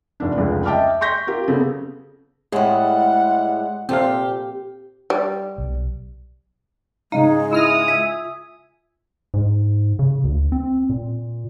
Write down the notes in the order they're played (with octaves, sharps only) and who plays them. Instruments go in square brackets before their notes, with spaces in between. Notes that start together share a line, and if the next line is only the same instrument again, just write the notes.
[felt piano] F1 D4
F1 C#2 C#3
D#5 E5 G5 A5 D6 F6
C6 C#6 G6 A#6 B6
F4 G4 A#4 F5
C#3 B3 A4
[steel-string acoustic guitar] A2 G3 [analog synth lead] G#3 [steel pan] G#4 [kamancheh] F#5
[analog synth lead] A#2 [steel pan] C4 A4 F5 [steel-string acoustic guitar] G4
[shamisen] G3
[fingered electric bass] B1
[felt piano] G#2 C#3 F5 [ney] G#3 [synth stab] D#4
[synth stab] E4 F6 A#6 [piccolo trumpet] D#6
[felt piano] F4 [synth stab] E5 G#5
[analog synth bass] G#2
C#3
D2
C4
A#2